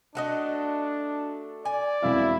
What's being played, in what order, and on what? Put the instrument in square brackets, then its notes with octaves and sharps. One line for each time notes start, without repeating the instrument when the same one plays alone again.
[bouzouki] A3 F#4 D#5 [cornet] D4
[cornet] D5 [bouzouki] G#5
[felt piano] E1 C4 F5 [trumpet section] E4